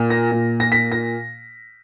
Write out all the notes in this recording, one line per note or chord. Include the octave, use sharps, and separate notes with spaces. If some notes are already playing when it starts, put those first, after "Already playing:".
Already playing: A#2
A#6
A#2
A#6
B6
A#6